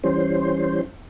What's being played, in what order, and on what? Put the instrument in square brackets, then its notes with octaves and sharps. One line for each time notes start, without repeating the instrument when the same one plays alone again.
[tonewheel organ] E3 G3 C#4 C5